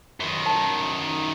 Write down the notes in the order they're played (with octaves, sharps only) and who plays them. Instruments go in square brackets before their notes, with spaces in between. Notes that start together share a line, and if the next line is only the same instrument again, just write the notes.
[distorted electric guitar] F#2 D#3
[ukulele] A5